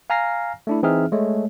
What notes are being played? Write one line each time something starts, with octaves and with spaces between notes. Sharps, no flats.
F5 G#5 A#5 F6 A#6 C7
A3 D4 E4
E3 C4 D#4 G#4 E5 F6
G#3 A3 C#5